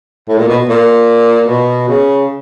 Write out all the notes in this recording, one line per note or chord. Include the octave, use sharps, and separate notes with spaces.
A2
A#2
B2
A#2
B2
C#3